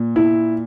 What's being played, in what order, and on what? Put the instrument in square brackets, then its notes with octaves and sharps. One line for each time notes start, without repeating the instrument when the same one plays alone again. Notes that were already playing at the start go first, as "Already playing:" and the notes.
Already playing: [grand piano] A#2
E4